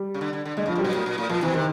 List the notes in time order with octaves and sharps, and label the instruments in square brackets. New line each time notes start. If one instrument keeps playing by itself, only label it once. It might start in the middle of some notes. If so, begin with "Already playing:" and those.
Already playing: [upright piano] G3
[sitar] C#3
D3
D3
D3
[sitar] D3 [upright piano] G#3
[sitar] C#3
[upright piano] F3
[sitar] C3 [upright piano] G3
[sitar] A#2 [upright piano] F#3
[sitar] A2
A#2
A2
[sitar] A#2 [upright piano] F3
[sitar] B2 [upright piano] E3
[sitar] C3 [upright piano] D#3